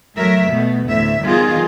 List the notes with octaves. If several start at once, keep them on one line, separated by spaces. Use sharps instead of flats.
F#3 A3 A#4 E5
B2 A3 B3
D2 A2 E5
D#3 G3 B3 F4 G#4